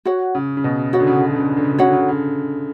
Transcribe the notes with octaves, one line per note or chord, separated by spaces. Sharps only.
F#4 C#5 F#5
C#3
C#3
B2
C#3 F#4 C#5 F#5
D3
C#3
D3
C#3
D3
C#3
D3
C#3
D3
C#3
D3
C#3 F#4 C#5 F#5
D3
C#3
D3
C#3